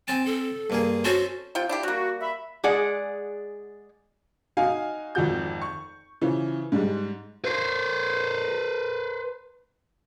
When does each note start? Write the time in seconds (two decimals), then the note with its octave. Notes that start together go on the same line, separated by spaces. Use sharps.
0.08 C4 G#5 A5
0.26 A4
0.70 G2 A#3 G#4
1.05 C#4 F#4 A4 C5
1.55 C3 F4 G5
1.69 D4 E4 G4
1.83 G3 A#3 F#4
2.21 E5 B5
2.64 G#3 G#4 D5 F#5
4.57 D#4 F#4 F5 G#5
5.15 G#1 F2 F3 F#4 G6
5.62 C#6
6.21 C#3 E3 F3
6.72 G#2 G3 G#3
7.45 B4 C5